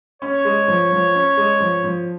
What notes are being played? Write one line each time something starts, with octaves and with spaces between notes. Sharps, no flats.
C#4 C#5
G#3
F3
F3
C#4
G#3
F3
F3